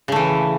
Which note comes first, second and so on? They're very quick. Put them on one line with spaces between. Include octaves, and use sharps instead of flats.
C#3 A3 E3